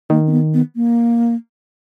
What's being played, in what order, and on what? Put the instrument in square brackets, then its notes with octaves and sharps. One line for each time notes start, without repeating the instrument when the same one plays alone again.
[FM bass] D#3 [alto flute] A#3
[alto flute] C4
B3
B3
A#3